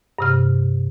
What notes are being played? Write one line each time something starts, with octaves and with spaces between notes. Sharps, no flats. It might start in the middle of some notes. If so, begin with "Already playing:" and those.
G2 C3 F6